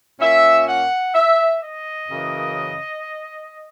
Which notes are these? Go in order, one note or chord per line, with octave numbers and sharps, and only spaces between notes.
A#2 A#3 C#4 E5
F#5
E5
D#5
F#2 C#3 E3 A#3